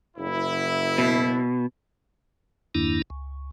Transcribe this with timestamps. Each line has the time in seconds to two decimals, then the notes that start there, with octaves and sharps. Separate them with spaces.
0.17 F#1 E4
0.98 B2
2.75 E2 G2 D#3 A#3 D4 E4
3.10 C#2